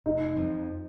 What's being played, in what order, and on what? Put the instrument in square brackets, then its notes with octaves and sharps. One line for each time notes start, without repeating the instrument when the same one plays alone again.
[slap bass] F1 [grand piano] D#4
[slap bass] F2 F3